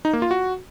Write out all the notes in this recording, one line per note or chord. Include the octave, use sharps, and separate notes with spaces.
D#4
A#3
F4
F#4